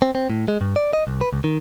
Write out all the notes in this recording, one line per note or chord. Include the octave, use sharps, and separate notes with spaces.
C4
C4
A2
G#3
G2
D5
D#5
C2
B4
C#2
D#3